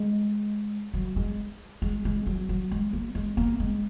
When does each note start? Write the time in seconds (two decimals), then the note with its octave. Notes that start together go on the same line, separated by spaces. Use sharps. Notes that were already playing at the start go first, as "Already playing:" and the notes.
Already playing: G#3
0.94 F#3
1.16 G#3
1.82 G#3
2.05 G#3
2.27 F#3
2.49 F#3
2.71 G#3
2.93 A#3
3.15 G#3
3.37 A#3
3.60 G#3